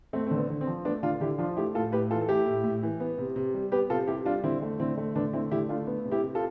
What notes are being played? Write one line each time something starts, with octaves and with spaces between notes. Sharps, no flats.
A3 C4
D3 C4
B3
D3
C4
F3
A3 B3 D4
D3 D4 F4
D3 E4 G4
F3 D4 F4
A3 E4 G4
A2 F4 A4
A2 G4 B4
E3 F4 A4
A4
A3 E4 G4
A2
A2
E3
B3
C3
C3
G3
B3 G4 B4
C3 F4 A4
C3 E4 G4
G3 D4 F4
D3 C4 E4
A3
D3 C4 E4
A3
D3 B3 D4
A3 C4 E4
D3 E4 G4
A3 D4 F4
B3
C3
E4 G4
C3
F4 A4